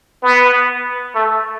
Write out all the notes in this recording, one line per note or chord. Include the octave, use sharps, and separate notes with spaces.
B3
A3